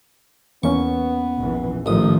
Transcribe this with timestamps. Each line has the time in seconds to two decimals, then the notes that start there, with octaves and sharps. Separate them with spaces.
0.63 E2 A#3 B3 C#4 C#6
1.37 A#1 E3
1.86 A1 A2 D#3 F3 D#6